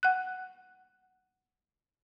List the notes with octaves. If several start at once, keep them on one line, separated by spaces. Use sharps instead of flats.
F#5 F#6